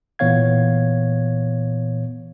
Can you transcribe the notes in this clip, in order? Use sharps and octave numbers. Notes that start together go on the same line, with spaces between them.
A#2 E3 B3 C#5 F5 G#6